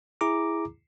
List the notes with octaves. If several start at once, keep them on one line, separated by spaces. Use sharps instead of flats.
E4 G#4 A#5 D6